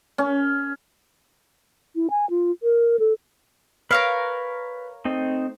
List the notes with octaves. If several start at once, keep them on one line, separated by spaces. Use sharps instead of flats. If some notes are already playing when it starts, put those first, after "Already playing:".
C#4
E4
G#5
F4
A#4
A4
A#4 B4 C#5 F5 F6
A3 C4 D#4